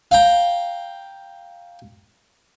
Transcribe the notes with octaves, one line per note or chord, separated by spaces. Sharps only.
F5 G5 A#5